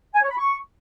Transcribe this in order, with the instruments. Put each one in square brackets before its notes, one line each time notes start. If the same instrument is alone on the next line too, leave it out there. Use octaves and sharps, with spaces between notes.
[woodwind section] G#5
C#5
B5
C#6